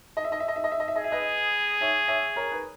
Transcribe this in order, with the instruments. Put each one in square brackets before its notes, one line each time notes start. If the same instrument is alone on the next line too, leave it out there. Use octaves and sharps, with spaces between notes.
[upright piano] D#5
E5
D#5
E5
D#5
E5
D#5
E5
D#5
E5
[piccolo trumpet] G#4 [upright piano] D#5
[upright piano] E5
B4 D#5
C#5 E5
C#5 E5
A#4 C#5
B4